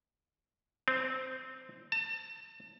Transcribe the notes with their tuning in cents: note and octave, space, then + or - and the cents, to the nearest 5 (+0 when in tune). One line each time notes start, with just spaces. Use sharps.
C4 -10
A5 +35